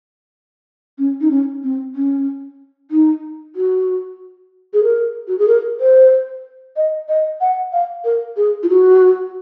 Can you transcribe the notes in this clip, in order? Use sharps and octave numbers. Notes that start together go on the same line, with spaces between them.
C#4
D#4
C#4
C4
C#4
D#4
F#4
G#4
A#4
F#4
G#4
A#4
C5
D#5
D#5
F#5
F5
A#4
G#4
F4
F#4